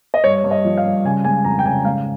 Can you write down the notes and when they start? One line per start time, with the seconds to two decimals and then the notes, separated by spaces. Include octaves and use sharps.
0.14 D#5
0.24 G2 C#5
0.44 G2
0.51 D#5
0.65 F3
0.78 F5
0.85 G2
1.04 C#3 G#5
1.24 G#3 G#5
1.45 F2 A#5
1.59 G5
1.66 C#3 G#5
1.85 G#2 F5